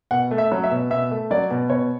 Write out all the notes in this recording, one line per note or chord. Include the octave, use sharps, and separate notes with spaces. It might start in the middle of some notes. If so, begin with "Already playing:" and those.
B2 F#5
A3
E5
F#3
E5
B2
B2 E5
A3
F#3 D5
B2
B2 C#5